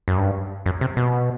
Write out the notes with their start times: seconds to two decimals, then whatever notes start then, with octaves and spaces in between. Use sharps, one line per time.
0.08 F#2
0.17 G2
0.66 F#2
0.81 C3
0.97 B2